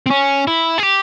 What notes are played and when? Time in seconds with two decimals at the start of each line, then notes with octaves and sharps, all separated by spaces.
0.06 C4
0.10 C#4
0.48 E4
0.78 G#4
0.83 G4